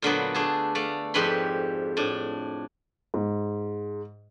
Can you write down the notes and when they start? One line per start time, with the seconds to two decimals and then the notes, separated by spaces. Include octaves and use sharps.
0.02 A#2 D3 F#3 B3
0.35 A3 D4 G#4 A5
0.75 A3 D5 F5
1.14 F2 G#2 G4 B4 B5 C6
1.97 A2 D4
3.14 G#2